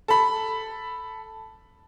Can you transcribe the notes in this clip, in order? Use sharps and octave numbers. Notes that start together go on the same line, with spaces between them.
A4 B5